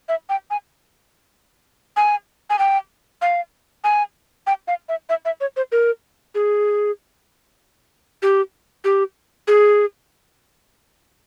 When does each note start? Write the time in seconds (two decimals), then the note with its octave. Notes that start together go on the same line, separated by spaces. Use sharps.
0.09 E5
0.29 G5
0.51 G#5
1.97 G#5
2.50 G#5
2.59 G5
3.22 F5
3.84 G#5
4.47 G5
4.68 F5
4.89 E5
5.09 E5
5.25 E5
5.41 C#5
5.57 C5
5.72 A#4
6.35 G#4
8.22 G4
8.84 G4
9.48 G#4